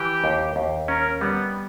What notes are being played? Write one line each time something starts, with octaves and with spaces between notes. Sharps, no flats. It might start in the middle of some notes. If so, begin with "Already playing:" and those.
Already playing: E3 G4
D#2
D#2
C#4 A#4
G3 B3